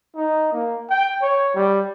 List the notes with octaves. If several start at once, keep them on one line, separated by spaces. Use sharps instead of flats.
D#4
A#3
G5
C#5
G3